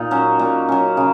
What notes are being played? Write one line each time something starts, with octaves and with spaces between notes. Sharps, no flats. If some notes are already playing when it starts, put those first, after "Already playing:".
Already playing: A#2 D#4
F#3 C#4
A#2
F#3 C#4
C#3